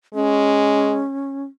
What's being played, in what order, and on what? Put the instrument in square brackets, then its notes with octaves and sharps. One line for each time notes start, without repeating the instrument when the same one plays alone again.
[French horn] G#3 [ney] C#4